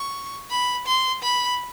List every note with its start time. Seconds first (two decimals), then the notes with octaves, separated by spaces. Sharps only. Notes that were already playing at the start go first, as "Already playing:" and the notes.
Already playing: C#6
0.50 B5
0.86 C6
1.23 B5